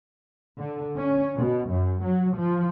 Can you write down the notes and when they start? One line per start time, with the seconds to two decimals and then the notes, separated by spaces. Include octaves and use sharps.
0.58 D3
0.96 C#4
1.37 B2
1.70 F#2
2.03 F#3
2.36 F3